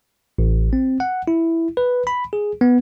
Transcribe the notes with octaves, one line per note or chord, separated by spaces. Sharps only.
A1
C4
F#5
E4
B4
B5
G#4
B3